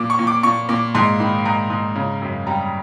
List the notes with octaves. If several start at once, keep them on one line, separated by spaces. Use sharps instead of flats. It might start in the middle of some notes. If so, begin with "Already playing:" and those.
Already playing: A#2 D6
C#6
A#2
D6
A#2 C#6
A#2 D6
G#2 C6
D#3 B5
G#2 A#5
G#2
C#3
F#2
G3 A#5